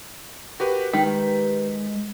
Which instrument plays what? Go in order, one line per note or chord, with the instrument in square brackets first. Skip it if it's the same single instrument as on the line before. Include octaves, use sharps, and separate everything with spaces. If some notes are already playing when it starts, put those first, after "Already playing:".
[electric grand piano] F#4 G4 B4 [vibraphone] A#4
[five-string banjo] D#3 [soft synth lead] G#3 [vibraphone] G4 B4 [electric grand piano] B6